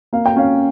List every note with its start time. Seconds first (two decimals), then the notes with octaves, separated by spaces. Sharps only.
0.13 A#3 F5
0.26 G5
0.36 C#4 F5